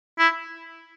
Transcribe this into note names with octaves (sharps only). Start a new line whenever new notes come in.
E4